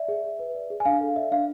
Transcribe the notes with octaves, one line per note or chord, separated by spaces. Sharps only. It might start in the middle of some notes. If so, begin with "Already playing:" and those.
Already playing: D5 E5
G#4
G#4
B4
D5
G#4
G#5
D4 F5
A4
D5 E5
D4 F5